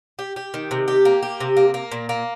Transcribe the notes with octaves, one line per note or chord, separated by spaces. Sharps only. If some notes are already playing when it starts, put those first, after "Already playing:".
G4
G4
D#3
C3
G4
A#3
G4
C3
A#3
A#3
A#2
A#3